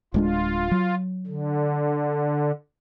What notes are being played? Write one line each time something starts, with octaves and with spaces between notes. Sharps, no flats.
D1 G#3 D4 F4
F#3
D3